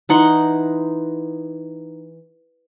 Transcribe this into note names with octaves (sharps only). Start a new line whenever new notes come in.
E3 D#4 F#5 C6